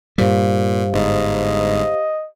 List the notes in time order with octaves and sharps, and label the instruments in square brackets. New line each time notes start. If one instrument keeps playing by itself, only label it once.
[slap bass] G2 G3 [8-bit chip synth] A#2 [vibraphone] G4 C5 F5
[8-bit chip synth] G1 G#2 [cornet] D#5